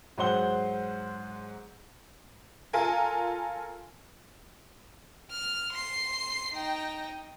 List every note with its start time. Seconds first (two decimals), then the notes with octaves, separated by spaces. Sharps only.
0.18 G#2 F#3 C5 F#5 C6 G7
2.73 F4 A4 A#4 G#5
5.31 F6
5.73 C6 C7
6.54 D#4 G5